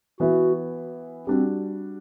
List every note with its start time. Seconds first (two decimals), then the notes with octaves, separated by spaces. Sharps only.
0.20 E3 B3 E4 F#4
1.27 G3 C4 D4 F#4